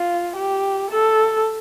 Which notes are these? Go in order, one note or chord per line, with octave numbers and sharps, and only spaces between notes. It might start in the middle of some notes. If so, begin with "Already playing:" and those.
Already playing: F4
G4
A4